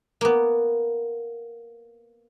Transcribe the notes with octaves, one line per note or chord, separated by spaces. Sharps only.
A#3 B3